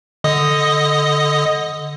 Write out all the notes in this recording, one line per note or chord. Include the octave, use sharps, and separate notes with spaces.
D3 D#5 D#6